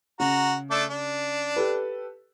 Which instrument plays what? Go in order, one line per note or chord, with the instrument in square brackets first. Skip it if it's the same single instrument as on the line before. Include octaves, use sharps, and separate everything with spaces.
[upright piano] C#3 [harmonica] F#4 A#5
[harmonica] A3 D4 D6
D4
[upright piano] G4 A4 B4